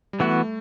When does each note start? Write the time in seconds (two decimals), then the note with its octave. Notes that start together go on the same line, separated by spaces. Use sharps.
0.13 G3
0.20 E3 A3 B3 F#4